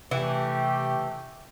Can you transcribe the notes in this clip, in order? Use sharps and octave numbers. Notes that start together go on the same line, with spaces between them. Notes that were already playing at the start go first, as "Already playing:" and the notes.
C3 E3 A3 G4